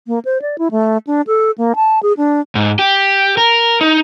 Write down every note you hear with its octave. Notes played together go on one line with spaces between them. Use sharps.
A#3
C5
D5
E4
A3
D4
A4
A#3
A5
G#4
D4
G#2
G4
A#4
D#4